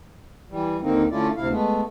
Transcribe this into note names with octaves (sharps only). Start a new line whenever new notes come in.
E3 G3
D#2 D3 A#3 C4 D#4
D3 A3 C#4 E4 F4 D5
D2 C3 E4 F5
G#3 A3 B3